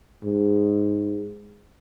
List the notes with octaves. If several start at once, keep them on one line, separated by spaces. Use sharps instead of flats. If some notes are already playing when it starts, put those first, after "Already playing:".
G#2